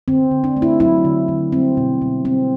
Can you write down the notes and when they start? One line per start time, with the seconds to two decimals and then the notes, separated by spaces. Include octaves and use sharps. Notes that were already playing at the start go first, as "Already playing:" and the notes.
0.08 D3 C4
0.31 D3
0.44 D4
0.57 A3
0.62 E4
0.80 F#3 E4
1.05 D3
1.28 D3
1.52 G3 C4
1.77 B2
2.02 B2
2.25 G3 C4